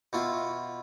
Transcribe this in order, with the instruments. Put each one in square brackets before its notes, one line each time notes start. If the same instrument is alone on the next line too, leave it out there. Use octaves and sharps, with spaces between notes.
[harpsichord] B2 E4 F4